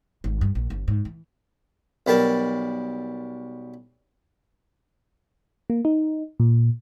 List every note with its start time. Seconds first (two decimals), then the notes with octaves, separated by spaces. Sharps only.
0.24 G#1
0.41 G2
0.55 A#1
0.70 G1
0.88 G#2
1.05 E3
2.07 B1 G3 A#4 A5
5.70 A#3
5.85 D#4
6.40 A#2